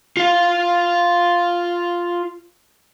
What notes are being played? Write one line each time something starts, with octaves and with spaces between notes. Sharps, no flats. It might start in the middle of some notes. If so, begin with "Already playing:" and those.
F4 F5